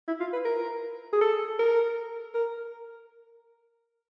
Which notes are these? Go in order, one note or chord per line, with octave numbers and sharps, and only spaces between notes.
E4
F4
B4
A#4
G#4
A4
A#4
A#4